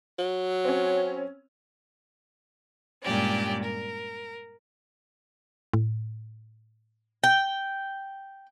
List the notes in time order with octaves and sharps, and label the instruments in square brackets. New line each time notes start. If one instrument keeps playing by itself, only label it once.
[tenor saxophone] F#3
[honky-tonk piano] C4 C#4
[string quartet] G2 A#2 G#3 C#4 G4 D5
A#4
[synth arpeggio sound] A2
[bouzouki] G5